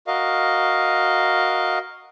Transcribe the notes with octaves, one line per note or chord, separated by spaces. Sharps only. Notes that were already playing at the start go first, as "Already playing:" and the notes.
F#4 A#4 D#5 F5